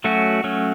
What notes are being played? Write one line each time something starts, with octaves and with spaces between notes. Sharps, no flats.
F#3 A3 C#4 F#4
F#3 A3 C#4